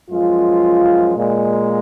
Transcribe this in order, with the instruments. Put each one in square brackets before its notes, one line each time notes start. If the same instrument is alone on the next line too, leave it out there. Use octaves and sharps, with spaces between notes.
[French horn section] F#2 F3 G#3 F4
A#2 G#3